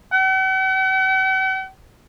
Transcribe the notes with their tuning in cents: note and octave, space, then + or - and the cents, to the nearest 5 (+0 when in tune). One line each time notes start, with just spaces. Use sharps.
F#5 +45